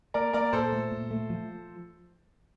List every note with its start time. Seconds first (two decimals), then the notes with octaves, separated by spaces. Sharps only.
0.14 A#3 A#4 D5
0.33 A#3 A#4 D5
0.53 A#2 A4 C5
0.72 A3
0.92 A#2
1.11 A3
1.30 F3